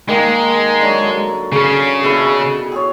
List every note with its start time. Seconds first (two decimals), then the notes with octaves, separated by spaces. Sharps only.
0.08 D#3 G#3 A#3 A#4
0.81 D3 F#3
1.52 C#3 C#4 G#4
2.03 B2 E4 A4
2.72 G#4 C#5